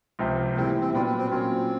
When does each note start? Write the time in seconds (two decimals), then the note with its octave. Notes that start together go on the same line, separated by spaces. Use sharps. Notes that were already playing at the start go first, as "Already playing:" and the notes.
0.19 C#2 C3 F3
0.56 A2 E3 G3 A#3 C4
0.81 C4
0.93 A#2 F#3 B3 C4 D4 F4
1.06 C4
1.18 C4
1.31 A#2 F#3 A#3 C4 C#4 F4